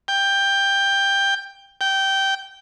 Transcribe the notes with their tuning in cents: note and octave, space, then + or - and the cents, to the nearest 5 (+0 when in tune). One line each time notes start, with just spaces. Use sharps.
G5 +10
G5 -15